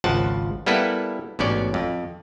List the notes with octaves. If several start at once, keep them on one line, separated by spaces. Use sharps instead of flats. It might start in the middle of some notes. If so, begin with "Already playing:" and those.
G#1 C#2 F3 F#5 A5
G3 A#3 B3 E4 A4 B4
A1 G#2 B2 C#4 D5
F2